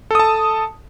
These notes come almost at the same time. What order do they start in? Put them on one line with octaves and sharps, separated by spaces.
A4 D#6 A5